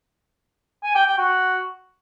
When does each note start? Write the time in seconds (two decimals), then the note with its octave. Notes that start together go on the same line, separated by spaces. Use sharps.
0.84 G#5
0.95 G5
1.06 G5
1.18 F#4